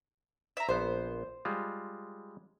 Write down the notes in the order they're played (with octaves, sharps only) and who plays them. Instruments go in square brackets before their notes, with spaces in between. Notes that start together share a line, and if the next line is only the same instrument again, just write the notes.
[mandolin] E5 A#5
[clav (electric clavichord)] A#1 B3 [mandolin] C5
[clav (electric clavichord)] G3 G#3 F4